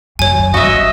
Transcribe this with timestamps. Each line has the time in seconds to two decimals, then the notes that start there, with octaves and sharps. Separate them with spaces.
0.19 F#2 D#3 C#5 G#5
0.54 G1 G2 F#4 D#5 E5